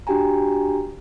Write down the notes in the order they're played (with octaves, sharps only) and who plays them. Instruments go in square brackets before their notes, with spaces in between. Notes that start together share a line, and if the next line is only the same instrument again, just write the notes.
[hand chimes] D4 F#4 G4 G5 G#5 A#5